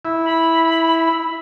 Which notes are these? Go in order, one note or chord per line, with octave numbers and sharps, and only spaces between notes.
E4
B5